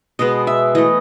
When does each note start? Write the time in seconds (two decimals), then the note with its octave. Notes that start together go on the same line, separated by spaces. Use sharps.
0.19 B2 G#3 B3 D#5
0.47 E5
0.75 E3 A3 D#5